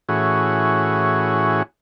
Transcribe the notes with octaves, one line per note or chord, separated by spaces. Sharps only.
A2 E3 C#4 F#4 G#4